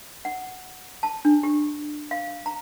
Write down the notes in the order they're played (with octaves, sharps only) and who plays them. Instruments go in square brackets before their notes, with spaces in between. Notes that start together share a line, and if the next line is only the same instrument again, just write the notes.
[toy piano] F#5
A5
D4
G4
F5
A#5